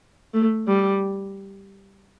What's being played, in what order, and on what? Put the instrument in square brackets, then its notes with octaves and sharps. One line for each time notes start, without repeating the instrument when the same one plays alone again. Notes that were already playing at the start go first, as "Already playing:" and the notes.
[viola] A3
G3